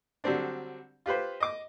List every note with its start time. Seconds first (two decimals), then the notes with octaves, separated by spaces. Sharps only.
0.24 D3 F#3 G3 C4 D4
1.06 F4 G4 B4 C5
1.40 D#5 D6